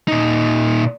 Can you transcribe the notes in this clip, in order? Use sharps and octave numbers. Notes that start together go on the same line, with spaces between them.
A#2 D#4